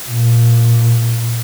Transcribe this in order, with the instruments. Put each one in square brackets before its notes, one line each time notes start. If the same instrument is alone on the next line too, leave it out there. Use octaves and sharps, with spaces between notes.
[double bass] A#2